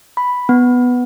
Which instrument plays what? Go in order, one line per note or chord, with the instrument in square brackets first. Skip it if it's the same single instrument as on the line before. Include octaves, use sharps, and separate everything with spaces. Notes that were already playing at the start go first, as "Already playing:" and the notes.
[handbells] B5
B3